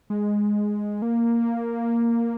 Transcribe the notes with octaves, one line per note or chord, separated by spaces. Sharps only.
G#3
A#3